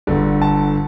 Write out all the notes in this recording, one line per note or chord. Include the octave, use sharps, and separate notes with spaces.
G1 G2 D3
A5